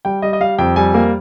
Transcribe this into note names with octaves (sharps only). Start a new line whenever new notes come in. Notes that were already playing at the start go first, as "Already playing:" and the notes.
G3 G5
G3 D#5
D#5
G3 F5
F2 G5
G3 G#5
A#3